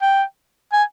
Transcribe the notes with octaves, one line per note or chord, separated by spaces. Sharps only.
G5
G#5